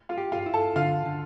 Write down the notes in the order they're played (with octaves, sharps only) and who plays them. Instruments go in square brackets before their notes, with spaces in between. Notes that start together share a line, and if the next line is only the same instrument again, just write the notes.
[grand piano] F4 F5
[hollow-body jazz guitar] G4
[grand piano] F4 F5
[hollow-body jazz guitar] E4
[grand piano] A4 A5
[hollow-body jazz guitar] D3 [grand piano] F4 F5
[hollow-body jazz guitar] D3